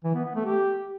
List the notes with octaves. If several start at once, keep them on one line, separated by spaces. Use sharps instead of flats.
E3
B3
B3
A3
G4